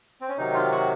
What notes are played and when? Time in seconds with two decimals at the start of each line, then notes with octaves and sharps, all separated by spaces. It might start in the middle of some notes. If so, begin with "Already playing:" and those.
0.21 C4
0.29 C#4
0.38 C3 D#3 F#3 D#4
0.54 F4
0.72 F#4